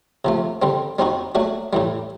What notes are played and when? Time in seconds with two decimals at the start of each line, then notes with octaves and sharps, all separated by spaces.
0.25 C3 F3 A3
0.62 D3 G3 C4
0.99 G3 C4 D#4 F#4
1.35 F#3 A3 D4 F#4
1.73 A2 E3 G3